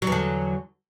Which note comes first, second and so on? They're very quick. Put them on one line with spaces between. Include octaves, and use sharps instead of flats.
F#3 E2 D3